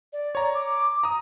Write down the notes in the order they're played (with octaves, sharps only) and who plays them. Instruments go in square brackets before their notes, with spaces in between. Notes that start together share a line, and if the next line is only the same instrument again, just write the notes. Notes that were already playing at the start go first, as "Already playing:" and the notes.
[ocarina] D5
[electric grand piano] C#5 A#5
[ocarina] D6
[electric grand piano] A#5 D#6